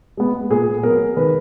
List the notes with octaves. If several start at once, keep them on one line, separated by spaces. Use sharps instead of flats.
G#3 B3
A#2 G#4
F#3 B3 A#4
D#3 B4